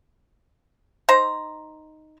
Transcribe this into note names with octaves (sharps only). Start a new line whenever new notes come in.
D#4 C5 A#5